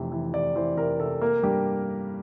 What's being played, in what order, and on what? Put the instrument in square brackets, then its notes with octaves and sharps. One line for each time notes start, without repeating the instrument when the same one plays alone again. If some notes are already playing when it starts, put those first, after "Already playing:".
Already playing: [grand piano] F1 C3 E3
E3
C3 D5
E3 C5
C3 A#4
C3 A4
A#3 A#4
G2 G4